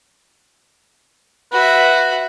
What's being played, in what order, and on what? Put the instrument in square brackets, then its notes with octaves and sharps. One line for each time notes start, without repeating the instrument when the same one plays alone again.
[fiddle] F#4 E5 [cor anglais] B4